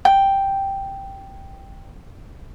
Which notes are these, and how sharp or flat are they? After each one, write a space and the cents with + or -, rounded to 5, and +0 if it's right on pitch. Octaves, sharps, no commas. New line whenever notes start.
G5 +0